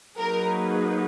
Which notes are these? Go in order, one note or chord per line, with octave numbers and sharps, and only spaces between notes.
F#3 A#3 D#4 G#4 A#4 B4